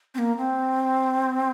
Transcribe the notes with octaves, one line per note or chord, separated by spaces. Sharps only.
C4
A#3
C4